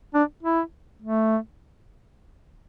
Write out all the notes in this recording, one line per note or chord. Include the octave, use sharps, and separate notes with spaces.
D4
E4
A3